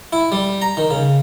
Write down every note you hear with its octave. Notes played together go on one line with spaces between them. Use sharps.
E4
G3
A#5
D#3
C#3